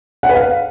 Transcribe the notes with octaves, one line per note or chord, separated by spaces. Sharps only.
F#5
B4
F5